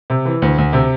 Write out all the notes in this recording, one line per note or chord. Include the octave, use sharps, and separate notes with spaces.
C3
E3
D2
D2
C3